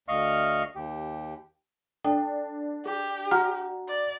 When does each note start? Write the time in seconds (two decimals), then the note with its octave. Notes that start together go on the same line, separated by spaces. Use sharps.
0.08 D2 D#5 F5 C#6 F6
0.75 D#2 G4
2.05 D4 A4 G5
2.86 G4 G#4
3.31 F#4 F#5 A#5 F6
3.88 D5